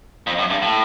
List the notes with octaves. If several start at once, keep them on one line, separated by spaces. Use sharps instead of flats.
F2
F#2
G2
A2